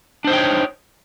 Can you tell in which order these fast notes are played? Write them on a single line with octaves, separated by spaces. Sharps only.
D4 C5 D#4 G5 C#5